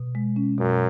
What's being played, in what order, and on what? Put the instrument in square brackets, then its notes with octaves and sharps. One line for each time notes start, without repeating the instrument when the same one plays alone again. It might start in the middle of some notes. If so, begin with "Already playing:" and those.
Already playing: [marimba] B2
G#3
C#4
[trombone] F#2 [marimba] B2